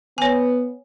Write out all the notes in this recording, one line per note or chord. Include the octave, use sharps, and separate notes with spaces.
B3 C#5 G#5